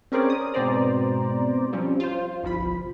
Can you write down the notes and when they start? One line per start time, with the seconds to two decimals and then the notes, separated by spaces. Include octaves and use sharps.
0.12 C4 C#4 G#4 A#4 C5 D5
0.30 D#6
0.54 G#2 B2 C4 C5 D5 A#5
1.73 F3 G3 C4 C#4
2.00 F4 C5
2.43 G1 C2 F3 B5